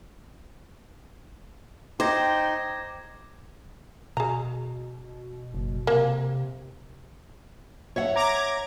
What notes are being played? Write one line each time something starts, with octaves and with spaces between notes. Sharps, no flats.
D#4 C5 G5 D6 G#6 A#6
B2 G#4 A#5
F#1
C3 A#3
C#5 E5 F#5
A#5 D6 G#6